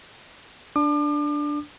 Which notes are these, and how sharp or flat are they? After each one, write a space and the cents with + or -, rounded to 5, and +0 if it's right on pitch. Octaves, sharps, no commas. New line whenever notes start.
D4 +0 D6 +40